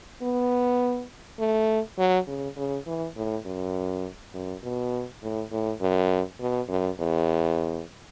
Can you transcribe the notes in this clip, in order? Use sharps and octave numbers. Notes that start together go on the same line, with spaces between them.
B3
A3
F#3
C#3
C#3
E3
A2
F#2
F#2
B2
A2
A2
F#2
B2
F#2
E2